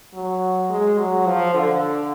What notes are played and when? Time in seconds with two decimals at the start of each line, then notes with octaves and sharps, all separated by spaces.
0.14 F#3
0.70 G#3
0.98 F#3
1.26 F3
1.54 D3